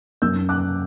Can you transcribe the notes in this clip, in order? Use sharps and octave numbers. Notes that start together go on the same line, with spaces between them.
F#2 E6 G6
D6 F#6